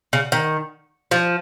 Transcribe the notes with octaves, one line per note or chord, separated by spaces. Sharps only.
C#3
D#3
F3